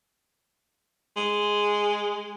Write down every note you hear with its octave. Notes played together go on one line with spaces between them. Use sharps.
G#3